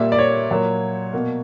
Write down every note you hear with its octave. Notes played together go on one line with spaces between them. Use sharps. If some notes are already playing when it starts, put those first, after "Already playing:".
Already playing: A#2 G3 A#3 E5
D5
C#5
A#2 F#3 A#3
B2 A#3